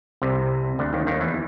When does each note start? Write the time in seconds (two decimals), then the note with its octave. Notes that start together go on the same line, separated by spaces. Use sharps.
0.22 C2 C3
0.79 D2 D3
0.93 D#2 D#3
1.07 D#2 D#3
1.21 E2 E3